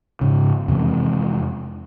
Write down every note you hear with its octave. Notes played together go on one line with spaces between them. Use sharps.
G#2 C#3
F2 C3 E3 G#3